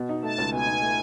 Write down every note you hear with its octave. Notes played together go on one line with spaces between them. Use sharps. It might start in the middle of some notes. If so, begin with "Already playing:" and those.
Already playing: B2
D#4
A3 A5
C#2
B2 G#5
D#4
A3